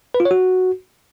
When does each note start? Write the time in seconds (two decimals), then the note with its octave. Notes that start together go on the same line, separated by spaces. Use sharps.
0.14 B4
0.20 F4
0.25 C#5
0.31 F#4